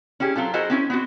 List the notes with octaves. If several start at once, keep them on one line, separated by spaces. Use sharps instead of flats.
C#4 E4 G4 G#4
F#3 C4 F4 A4
E4 F#4 G#4 A#4 C5 D#5
C4 C#4 E4
B3 C4 F#4